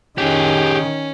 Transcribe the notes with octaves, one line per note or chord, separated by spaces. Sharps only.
D#3 C#4 G4 G#4